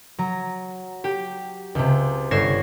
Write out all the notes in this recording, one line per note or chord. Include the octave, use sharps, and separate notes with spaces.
F#3 A#5
G4
C#2 C3
G1 C#5 G#6 A#6 C7 E7